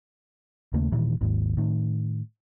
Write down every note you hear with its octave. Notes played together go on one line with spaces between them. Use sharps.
D#2 C#3 A3 A#3
D#1 A#2 D#3 E3
G#1 D#2 G#2
A2 D#3